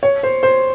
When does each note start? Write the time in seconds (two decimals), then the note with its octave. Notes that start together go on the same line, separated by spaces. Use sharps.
0.03 C#5
0.23 C5
0.43 C5